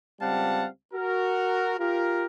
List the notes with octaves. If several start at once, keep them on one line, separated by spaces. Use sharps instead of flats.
C#2 G3 C4 F5 F#5 A5
F#4 A#4
F4 G4 A#4